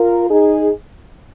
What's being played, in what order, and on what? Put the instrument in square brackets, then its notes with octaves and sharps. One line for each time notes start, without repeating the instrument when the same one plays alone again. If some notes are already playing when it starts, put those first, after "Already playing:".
Already playing: [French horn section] F4 A#4
D#4 G#4